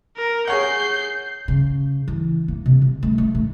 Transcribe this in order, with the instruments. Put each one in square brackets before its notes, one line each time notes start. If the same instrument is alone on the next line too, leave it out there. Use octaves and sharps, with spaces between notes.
[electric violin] A#4
[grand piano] G#4 C#5 F#5 [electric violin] G6 C7
[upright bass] C#3
E3
A#3
C3
D3
A3
A3
G#2